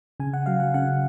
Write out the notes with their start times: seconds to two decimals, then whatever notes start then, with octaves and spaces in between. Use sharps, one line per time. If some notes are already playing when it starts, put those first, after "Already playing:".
0.20 C#3 G#5
0.34 F#5
0.46 F#3 F5
0.60 F#5
0.74 C#3 F#5